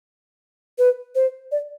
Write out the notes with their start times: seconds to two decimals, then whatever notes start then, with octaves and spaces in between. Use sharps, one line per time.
0.78 B4
1.15 C5
1.51 D5